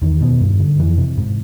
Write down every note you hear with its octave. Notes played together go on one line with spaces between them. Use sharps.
E2 D#3
B2
G2
D3
F2 E3
C3
G#2